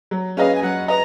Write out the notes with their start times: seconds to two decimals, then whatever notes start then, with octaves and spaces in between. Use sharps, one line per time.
0.11 F#3
0.37 C#4 G#4 B4 D#5 F5
0.55 G#5
0.63 F#3 F#5
0.88 B4 D#5 A#5